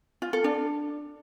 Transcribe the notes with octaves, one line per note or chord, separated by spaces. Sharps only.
F4
A4
D4